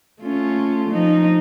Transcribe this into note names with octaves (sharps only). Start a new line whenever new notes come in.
A3 C#4 F4
F3 D#4